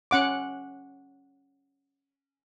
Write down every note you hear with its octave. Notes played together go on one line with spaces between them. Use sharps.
C#4 F#5 D6